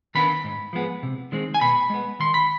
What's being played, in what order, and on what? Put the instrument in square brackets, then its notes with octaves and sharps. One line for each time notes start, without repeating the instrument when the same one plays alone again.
[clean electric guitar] D#3 B3 D4 B5
G#2
F3 G#3 B3
C3
D#3 G#3 C4
G#5
B2 B5
G#3 B3
D#3 C6
B5